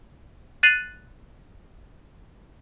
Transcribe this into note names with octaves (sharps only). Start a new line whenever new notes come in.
F#6 A6 C7 D#7 F7 F#7